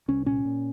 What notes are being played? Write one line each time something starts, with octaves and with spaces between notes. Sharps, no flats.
C2 C#4
A#2 C#4
A#2